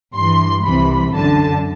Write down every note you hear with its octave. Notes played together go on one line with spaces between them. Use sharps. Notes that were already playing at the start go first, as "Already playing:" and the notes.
G2 E3 C6
C2 C3 E3 B5
F#2 D3 A5